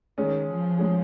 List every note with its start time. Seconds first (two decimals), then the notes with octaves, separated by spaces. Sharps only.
0.18 D#3 G#3 C#4 G#4
0.48 F3
0.78 G#3 C#4 G#4